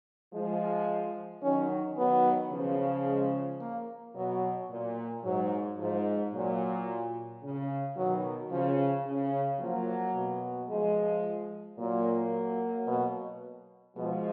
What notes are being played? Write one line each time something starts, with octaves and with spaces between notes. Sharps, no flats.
F3 G#3
D#3 F#3 C#4
D#3 F#3 B3
C#3 F3
G#3
A#3
B2 F#3
A#2
G#2 F#3
G#2 F3
A#2 F#3
C#3
B2 D#3 F#3
C#3 F3
C#3
F3 F#3 A#3
B2
F3 G#3
A#2 F#3 A#3
B2
B2 F3 G#3